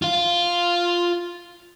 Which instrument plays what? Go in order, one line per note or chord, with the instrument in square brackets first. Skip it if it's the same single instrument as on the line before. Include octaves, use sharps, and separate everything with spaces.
[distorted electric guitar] F4 F5